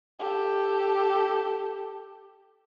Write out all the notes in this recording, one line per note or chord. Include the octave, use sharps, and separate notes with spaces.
G4 A4